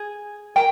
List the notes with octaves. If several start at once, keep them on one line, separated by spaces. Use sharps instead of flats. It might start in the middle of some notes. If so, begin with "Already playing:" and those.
Already playing: G#4
A#4 G5